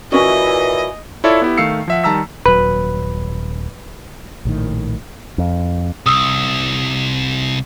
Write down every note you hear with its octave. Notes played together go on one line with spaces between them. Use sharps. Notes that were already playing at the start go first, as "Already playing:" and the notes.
A#2 E3 C#4 F#4 D#5
E4 F4 A4 C#5 D5 E5
B3 E4 G4
D#3 A3 F5 E6 C7 C#7
F3 E5 F#5
D#3 G3 A5 A#5 E6 B6
D#1 F#3 B4
A#1 A2 D#3
F2
C2 D#6 E6